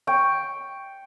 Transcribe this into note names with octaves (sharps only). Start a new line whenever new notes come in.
G5 C#6